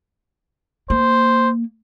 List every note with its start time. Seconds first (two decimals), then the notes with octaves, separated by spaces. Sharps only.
0.90 A#3 C5